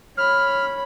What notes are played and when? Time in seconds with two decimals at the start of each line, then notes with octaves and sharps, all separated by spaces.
0.17 C#5 B5 F6